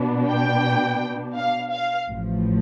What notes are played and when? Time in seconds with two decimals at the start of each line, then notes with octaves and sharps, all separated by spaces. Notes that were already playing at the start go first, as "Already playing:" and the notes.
Already playing: B2 B3 D4
0.30 G5
1.37 F5
1.72 F5
2.09 A1 A2 F3